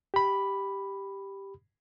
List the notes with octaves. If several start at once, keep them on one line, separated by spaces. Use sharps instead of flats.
G4 B5